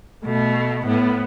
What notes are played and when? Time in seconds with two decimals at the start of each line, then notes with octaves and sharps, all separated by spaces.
0.25 B2 A3
0.86 A2 B3